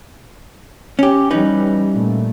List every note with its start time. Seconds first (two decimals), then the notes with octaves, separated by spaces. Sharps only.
0.99 C#4 G4
1.30 E3 G3 C#4 D#4 B4
1.93 A#2 A3